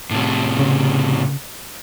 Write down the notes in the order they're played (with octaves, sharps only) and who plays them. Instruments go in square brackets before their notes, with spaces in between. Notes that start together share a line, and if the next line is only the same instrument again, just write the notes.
[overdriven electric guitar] A2 C3
[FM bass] C#3